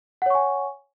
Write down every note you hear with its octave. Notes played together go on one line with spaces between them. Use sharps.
C#5 F#5 G#5 C#6